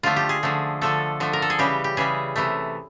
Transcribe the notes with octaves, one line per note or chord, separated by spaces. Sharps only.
D3 F3 A3 F4
G4
G#4
D3 F3 A3
D3 F3 A3 A4
D3 F3 A3
A#4
A4
G#4
C#3 E3 G3 G4
G4
C#3 E3 G3 G#4
C3 E3 A3